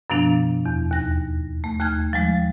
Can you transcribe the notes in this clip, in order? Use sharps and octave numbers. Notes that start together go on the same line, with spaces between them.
F#2 B2 F3 B3 D4
E2
D#2 A#6
A3
D#2 A3 F6 G#6
F3 G3 G#3